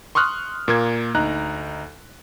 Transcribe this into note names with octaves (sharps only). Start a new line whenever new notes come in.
C6 C#6 D#6 F6 F#6
A#2 A#3 G#6
D2 D#4 A#5 F#6